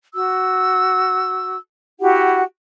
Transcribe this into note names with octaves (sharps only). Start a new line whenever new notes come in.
F#4 E6
E4 F#4 G4 F#5